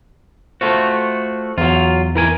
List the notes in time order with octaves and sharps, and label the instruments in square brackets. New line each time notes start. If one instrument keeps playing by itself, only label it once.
[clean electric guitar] A3 F4 F#4 [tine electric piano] C5
[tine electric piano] E2 [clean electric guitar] F#3 F4
[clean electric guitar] E3 A#4 G#5